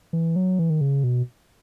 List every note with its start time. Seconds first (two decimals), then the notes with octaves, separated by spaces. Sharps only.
0.13 E3
0.36 F#3
0.59 E3
0.70 D#3
0.81 C#3
1.04 B2